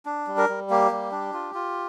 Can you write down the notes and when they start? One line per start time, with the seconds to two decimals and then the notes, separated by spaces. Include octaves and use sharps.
0.06 D4
0.27 G3
0.38 A#4
0.49 G3
0.70 A#3 G4
0.91 G3
1.12 D4
1.33 F4
1.55 F4